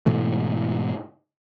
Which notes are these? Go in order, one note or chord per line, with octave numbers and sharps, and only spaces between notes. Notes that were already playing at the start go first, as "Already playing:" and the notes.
G#2 B2 E3 A3